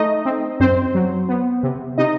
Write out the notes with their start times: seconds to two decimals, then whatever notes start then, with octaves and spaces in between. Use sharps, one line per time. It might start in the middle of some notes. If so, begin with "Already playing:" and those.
Already playing: A3 D#4 D#5
0.25 C4
0.60 F#2 C4 C5
0.95 F#3
1.29 B3
1.63 C3
1.98 C3 D#4 D#5